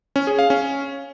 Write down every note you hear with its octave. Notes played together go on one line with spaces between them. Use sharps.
C#4
G#4
F5
C#4